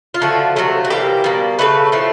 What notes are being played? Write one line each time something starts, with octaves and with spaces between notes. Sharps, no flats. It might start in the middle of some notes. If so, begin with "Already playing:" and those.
F4
D3 F3 A3 F#4
C3 D#3 F#3 A3
F#4
C3 E3 G3 A#3 G4
B2 G3 A#3
C#3 F3 A3 B4
A2 F3 A3